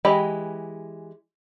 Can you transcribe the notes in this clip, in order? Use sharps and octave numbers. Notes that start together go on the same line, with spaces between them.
E3 G#3 G4 D#5 B5